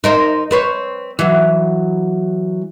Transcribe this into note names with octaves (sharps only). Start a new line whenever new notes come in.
D#4 A#4 C5
C4 B4 C#5
E3 F#3